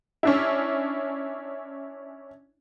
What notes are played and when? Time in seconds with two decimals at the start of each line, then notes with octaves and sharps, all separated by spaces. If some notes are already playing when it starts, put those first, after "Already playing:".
0.23 C#4 D4 E4